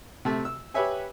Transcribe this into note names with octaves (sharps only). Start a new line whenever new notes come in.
C3 A3
E6
G4 B4 C#5 E5 G#5